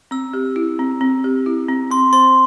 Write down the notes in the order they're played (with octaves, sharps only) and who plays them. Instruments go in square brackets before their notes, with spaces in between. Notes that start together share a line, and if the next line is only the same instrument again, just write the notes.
[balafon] C4 [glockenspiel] E6
[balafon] G4
E4
C4
C4
G4
E4
C4
[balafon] C4 [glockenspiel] C6
[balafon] C5 [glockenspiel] C6